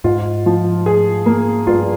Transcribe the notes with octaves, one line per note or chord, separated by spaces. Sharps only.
G#2 F4
F3
G#4
A#3
G2 F4